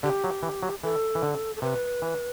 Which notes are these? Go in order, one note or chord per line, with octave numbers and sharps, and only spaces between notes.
D3 G4
F#3
E3
F#3
E3 A4
E3
D3
A4
C3 B4
E3